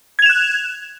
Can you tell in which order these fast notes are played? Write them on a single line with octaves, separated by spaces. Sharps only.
G#6 F7 E7 F#6